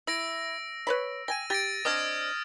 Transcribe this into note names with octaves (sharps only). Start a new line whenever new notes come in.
E4 E6 A#6 D7
B4 C#5 B5
G5 G#5 A#6 D#7
G4 A6 A#6 D7
C4 D4 D#5 D#6 F6 G#6